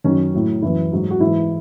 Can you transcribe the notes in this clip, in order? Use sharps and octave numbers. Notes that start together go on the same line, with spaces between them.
F#2 D#3 F#3 C#4
A2 F#3
F#2 E3 E4
G#2 F#3
F#4
G#2 E3 E4